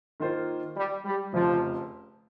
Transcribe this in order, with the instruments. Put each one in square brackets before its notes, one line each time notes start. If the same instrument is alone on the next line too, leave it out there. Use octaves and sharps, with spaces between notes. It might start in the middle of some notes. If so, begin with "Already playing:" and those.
[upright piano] D#3 A#3 F4 C5
[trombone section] G3
G3
[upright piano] F1 F2 C#3 [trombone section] F3